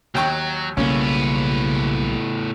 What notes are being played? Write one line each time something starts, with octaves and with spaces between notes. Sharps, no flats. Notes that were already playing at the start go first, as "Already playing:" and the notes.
D#2 F#3 G5 C#6
B1 A2 C#3 G3 A#3 B3 C#4